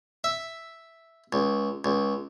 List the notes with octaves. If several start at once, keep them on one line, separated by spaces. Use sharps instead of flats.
E5
C#2
C#2